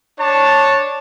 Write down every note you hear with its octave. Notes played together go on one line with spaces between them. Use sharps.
D4 C#5 D5 A5